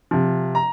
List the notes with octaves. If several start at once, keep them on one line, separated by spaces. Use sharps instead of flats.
C3 F3
A#5